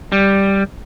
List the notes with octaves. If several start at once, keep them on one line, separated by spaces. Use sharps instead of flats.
G3